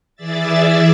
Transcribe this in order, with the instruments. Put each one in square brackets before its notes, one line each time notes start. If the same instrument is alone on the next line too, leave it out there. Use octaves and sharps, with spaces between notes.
[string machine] E3 G#4 D5 E5 A6